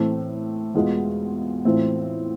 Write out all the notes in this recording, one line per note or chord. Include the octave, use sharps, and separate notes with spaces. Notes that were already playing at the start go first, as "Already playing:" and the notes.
Already playing: A2 E3 A3 C4
E2 B2 G#3 B3 F4
A2 E3 A3 C4 F4